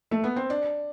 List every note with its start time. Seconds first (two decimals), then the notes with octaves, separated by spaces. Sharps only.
0.11 A3
0.24 B3
0.36 C4
0.50 D4